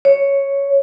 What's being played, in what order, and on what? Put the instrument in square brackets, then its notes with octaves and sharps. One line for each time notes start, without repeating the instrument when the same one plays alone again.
[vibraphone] C#5